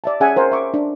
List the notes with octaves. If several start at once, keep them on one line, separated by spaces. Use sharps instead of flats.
D5 E5 A5
C#4 G#4 E5 F#5 G#5
A#4 C5 F#5
E5 C#6 D6
D4